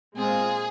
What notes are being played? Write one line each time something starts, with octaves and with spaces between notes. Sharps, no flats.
A#2 G#3 C4 F4 G#4